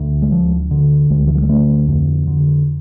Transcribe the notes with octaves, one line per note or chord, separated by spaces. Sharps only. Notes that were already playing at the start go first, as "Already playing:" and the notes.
Already playing: D2
G#3
D2 F3
D3
D2 G#3
E3
F3
G#3
D3 A3
F2
D3